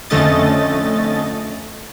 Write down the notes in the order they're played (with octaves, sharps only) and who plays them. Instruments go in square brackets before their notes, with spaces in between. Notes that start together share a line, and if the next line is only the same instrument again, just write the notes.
[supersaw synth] F2 D3 A3 C#4 D#5 A6